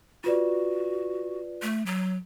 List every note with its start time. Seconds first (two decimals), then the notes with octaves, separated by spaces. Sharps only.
0.24 F4 F#4 B4 D5
1.62 A3
1.86 F#3